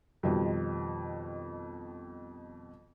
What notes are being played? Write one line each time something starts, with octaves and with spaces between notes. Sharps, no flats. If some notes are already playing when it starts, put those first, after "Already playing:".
F2 B2 D#3 G3